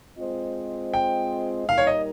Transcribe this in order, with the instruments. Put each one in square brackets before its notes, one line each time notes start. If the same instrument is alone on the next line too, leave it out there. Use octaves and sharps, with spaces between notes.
[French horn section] G#3 C4 F4 C5 D#5
[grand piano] G5
[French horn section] A#2 G3 A#3 D#4 A#4 [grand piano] F5
[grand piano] C#5
D#5